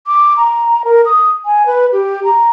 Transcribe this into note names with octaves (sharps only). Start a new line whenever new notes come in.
D6
A#5
A#4
D#6
G#5
B4
G4
A#5